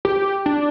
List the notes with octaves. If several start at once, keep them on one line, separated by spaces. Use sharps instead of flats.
G4
D4